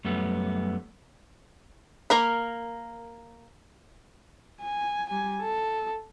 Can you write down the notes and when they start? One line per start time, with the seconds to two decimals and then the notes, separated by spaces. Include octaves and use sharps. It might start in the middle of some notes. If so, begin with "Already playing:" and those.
0.05 F#2 G3 A3 B3
2.10 A#3 A#4 B5
4.61 G#5
5.09 G3 G#5
5.42 A4